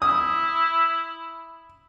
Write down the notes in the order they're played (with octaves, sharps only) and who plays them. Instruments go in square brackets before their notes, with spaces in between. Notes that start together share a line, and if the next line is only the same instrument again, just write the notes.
[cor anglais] E4 [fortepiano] D#6